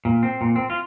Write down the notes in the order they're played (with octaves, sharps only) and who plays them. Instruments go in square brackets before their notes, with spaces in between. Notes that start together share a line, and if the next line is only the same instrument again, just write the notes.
[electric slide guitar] A#2
C4
A#2
C4
F4